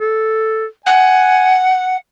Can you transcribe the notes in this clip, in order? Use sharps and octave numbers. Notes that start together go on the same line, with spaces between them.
A4
F#5 G#5